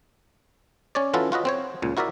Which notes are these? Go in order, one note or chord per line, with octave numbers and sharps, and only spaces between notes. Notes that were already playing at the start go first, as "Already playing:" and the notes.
C#4 C#5 D5
E3 C#4 F4 F#4 A4 B4
F4 F#4 B4 D#5
C4 C5 C#5
C#2 A#2
E4 F#4 A#4 D5 E5